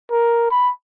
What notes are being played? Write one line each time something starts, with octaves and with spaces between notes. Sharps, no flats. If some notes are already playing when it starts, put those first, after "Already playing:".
A#4
B5